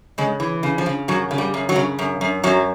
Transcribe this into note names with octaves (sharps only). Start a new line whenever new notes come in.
C#3 G#3
E3
C#3
F3
C#3
F#2 F#3
C#3
G3
F#2
F#3
C#3
F#2
F#2
F#2 F#3